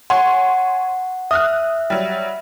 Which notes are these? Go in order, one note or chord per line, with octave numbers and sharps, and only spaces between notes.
C#5 F#5 G#5 C6
E5 D#6 F6 F#6
F#3 G3